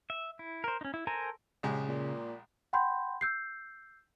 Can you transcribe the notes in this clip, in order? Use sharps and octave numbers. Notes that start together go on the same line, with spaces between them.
E5
E4
A#4 C5
C#4 D#4
E4
A4 A#4 C5 G#5 A#5
A#1 C#3 G#3 G4
A#2
F#5 G5 B5 C6 G6
E6 G6 C7